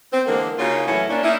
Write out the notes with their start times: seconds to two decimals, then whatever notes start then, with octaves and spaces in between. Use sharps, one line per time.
0.12 C4
0.26 D3 E3 G#3 A#3
0.59 C#3 A#3 D#4 F4 F#4 C#5
0.87 A2 E3 F#3 C#4 E4
1.10 A#3 C#4 D4
1.24 A#3 C#4 D#4 E4